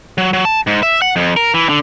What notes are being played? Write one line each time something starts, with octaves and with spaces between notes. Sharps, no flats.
F#3
F#3
A5
G#2
E5
F#5
F2
A#4
E3
D3